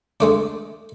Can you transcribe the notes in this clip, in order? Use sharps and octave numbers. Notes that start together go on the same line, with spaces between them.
G#3 A3 D4